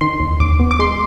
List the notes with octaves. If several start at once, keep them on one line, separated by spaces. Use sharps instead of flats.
D#3 C6
D#2
D#2 D6
B3
D6
G#3 C6